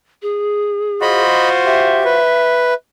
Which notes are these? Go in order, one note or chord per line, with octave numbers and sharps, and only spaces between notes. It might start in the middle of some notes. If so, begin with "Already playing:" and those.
G#4
F4 F#4 C5 D#5 B5
G4 E5
B4